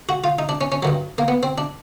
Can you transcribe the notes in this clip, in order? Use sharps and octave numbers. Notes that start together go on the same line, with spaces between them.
F#4
F4
D#4
D4
C#4
C#4
G2 D#3 F#3
A#3
B3
C4
D4